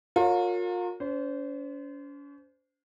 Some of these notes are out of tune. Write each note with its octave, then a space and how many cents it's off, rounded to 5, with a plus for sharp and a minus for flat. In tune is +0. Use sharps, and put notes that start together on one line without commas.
F4 +40 A#4 -25 C#5 +0
C#4 +45 C5 -20